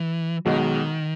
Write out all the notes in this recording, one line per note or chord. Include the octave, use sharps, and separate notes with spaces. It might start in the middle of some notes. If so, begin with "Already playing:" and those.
Already playing: E3
B1 B2 D#3 G#3